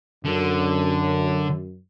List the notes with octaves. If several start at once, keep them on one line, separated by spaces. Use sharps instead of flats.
F#2 D3